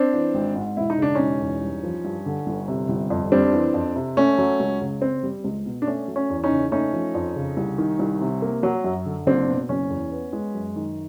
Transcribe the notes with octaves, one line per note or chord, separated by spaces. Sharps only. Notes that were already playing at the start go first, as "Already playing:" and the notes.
Already playing: C4 D4
E3
G#1
G#2
E1 E4
D#4
C#3 D4
E1 C#4 D#4
E2
G2
F3
G2
D3
G1
C3
G1
F2
G3 C4 D4
E3
F2
C3
A3 C#4
F#3
C#2
C#3
C4
G3
C#2
B2
D4
A3 C#4
F#3
C#4
E2
C#4 D#4
C#3
A3 C#4 D#4
F3
F2
C#3
C2
D#3
C2
C3
A#3
F#3
F#2
D3
F#1 C4 D4
B2
F#1 C#4
E2
B3
G#3
F#2
D#3